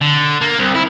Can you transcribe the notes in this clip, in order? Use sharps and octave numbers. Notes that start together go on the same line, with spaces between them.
D3
A#3
C2
E4